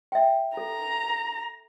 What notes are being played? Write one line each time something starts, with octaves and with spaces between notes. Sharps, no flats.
E5 G5
A4 A#5